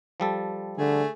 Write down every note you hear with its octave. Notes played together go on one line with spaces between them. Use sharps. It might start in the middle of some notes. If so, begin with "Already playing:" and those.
F3 G3 A4
D3 A3 G#4